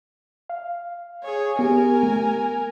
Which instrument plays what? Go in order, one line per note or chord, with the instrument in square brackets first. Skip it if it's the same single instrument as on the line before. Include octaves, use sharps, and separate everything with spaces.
[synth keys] F5
[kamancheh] G#4 C#5
[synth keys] B3 G4 [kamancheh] A#4 G#5
[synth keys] A3